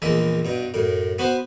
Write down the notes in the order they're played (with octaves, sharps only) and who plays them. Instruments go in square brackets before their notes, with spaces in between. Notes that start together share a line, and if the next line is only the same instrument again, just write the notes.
[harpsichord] A#1 E2 G#3 A#3 E5
G2 B2
F#2 A2
B3 F#4 B4 C5